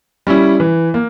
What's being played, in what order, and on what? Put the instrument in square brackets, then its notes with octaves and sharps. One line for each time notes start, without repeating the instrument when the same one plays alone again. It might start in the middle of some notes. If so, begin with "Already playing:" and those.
[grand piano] G3 C#4 E4
E3
A#3